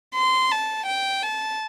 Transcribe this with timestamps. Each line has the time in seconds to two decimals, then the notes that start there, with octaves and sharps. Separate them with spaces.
0.15 C6
0.52 A5
0.87 G5
1.23 A5